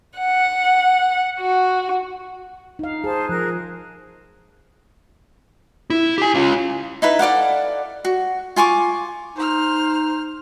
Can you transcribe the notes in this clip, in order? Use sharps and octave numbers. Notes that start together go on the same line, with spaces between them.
F#5
F#4
D#4 F5
G#4 C5 A5
F3 G#4 A#4 F#6
E4
G4 G#5
C#4 F4
D#4 E4 B4
A4 D5 F5 F#5
F#4
F4 G#5 C#6 D6
D#4 C5 F6